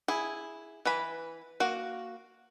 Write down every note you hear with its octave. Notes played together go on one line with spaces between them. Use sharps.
E4 G#4
E3 B4 B5
A#3 F#4